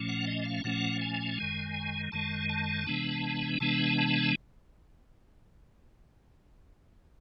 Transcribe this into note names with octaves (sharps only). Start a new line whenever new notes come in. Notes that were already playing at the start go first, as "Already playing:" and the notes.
Already playing: A#2 F3 A3 C#4
F#5
D#5
F5
A#2 F3 A3 C#4 F#5
G#5
F#2 D#3 G#3
F#2 D#3 G#3 A5
A5
C3 E3 G#3 B3 D4
C3 E3 G#3 B3 D4 A5
A5